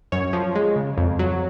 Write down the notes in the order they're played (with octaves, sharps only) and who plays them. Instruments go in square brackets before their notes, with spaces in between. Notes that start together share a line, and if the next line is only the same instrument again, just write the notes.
[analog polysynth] F#2 C#5
F3
G#3
C#3
F2
F#3